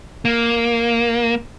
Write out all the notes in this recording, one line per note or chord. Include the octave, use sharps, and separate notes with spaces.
A#3